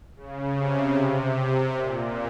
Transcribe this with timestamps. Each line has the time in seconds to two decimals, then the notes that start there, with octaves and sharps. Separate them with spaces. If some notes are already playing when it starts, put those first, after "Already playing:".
0.16 C#3
0.55 C3
0.96 C3
1.74 A#2